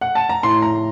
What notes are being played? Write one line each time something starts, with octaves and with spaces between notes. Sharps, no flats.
F#5
A5
A#5
A2 C6
A#5